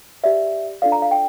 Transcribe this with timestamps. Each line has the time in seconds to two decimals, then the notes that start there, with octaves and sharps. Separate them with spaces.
0.24 G4 D5 E5
0.82 D4 F4 A4 D5 F5
0.92 A#5
1.02 F5
1.11 G5